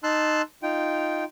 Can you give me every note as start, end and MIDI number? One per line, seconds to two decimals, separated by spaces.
0.04 0.42 63
0.04 0.42 81
0.04 0.42 84
0.04 0.42 88
0.04 0.42 90
0.63 1.24 63
0.63 1.24 65
0.63 1.24 79